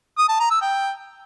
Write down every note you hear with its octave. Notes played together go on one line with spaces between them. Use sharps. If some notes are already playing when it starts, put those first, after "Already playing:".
D#6
A5
A#5
E6
G5